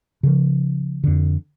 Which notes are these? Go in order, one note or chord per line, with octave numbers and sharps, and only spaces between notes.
C#3 F3
F2 D3